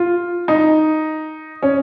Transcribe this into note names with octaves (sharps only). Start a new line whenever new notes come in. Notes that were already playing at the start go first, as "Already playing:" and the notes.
Already playing: F4
D#4
C#4